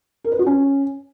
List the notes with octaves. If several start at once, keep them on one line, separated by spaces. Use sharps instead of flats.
A#4
B4
F#4
C#4